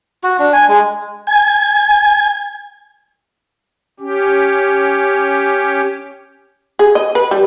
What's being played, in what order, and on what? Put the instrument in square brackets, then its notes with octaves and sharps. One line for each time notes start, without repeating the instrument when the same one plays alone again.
[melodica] F#4
D4
G#5
G#3
[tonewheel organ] G#5
[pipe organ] C#4 G4
[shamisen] G#4
D#5
B4
G3